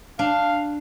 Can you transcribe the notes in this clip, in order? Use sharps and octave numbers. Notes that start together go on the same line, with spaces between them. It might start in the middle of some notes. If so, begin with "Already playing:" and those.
D4 F5